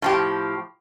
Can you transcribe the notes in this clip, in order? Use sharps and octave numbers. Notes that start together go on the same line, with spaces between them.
A2 F3 G4